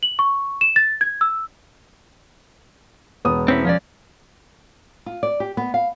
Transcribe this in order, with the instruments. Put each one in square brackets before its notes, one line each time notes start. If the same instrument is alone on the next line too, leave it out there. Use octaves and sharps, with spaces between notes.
[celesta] F#7
C#6
E7
A6
G#6
E6
[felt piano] E1 B3 D#6
[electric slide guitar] C4 C#4 E4
F3 C#4 D5
[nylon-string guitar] F4
D5
G4
B3
F5